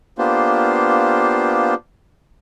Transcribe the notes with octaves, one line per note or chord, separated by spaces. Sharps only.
A#3 B3 D4 F4 G4 C5